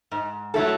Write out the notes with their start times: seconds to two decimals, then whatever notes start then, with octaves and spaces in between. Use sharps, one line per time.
0.12 G#2
0.54 F#3 A3 E4 A4